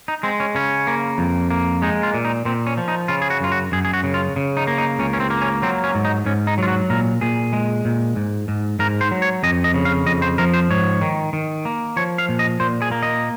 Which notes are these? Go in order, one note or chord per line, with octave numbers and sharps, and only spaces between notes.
D#4
G#3 C4
C#4
C#3 C#4
A#3
F2
A#3
G#3 D#4
F4
A#2
D#4
A#2 C4
C#4
F3
D#4
C#3 F4
G#4
F#4
F#2 F4
F#4
F#2 G#4
G#4
F#4
C#3
F4
C#3
D#4
A#3
D#4
C#2 C#4
C#4
C4
A#3
C#4
F#3 C4
C#4
G#2
D#4
G#2 C#4
D#4
F#3 F4
F#4
A#2 A#4
A#2 G#4
G#3
A#2
G#2
G#2
G#2 A#4
C5
F#3
C#5
F2 D#5
D#5
C#3
F5
F2 D#5
C5
F3 A#4
C5
G#2 C#5
D#3
D#3
A#3
F3 C#5
F5
A#2
D#5
A#2 C5
G#4
A#3
D#5